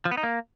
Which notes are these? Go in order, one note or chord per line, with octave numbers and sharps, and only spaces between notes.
F3
B3
D#4
A#3